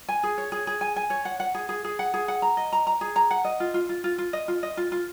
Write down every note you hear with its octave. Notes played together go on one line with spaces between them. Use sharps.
G#5
G#4
C#5
G#4
G#4
G#5
G#5
C#5
F#5
F#5
G#4
G#4
G#4
F#5
G#4
F#5
A#5
D#5
A#5
A#5
G#4
A#5
F#5
D#5
F4
F4
F4
F4
F4
D#5
F4
D#5
F4
F4